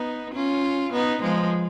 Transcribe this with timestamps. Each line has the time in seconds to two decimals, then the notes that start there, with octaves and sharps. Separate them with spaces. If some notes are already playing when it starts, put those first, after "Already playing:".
Already playing: B3 D#4
0.34 C#4 F4
0.92 B3 D#4
1.22 F3 G#3